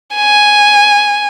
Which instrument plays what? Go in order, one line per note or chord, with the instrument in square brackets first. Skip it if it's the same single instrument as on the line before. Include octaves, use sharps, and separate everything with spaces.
[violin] G#5